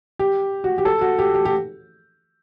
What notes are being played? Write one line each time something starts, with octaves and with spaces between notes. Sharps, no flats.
G4
F#4
G4
A4
F#4
G4
G4
G4